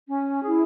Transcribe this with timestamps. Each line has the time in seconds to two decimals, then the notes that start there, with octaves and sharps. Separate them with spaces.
0.07 C#4
0.42 E4 G#4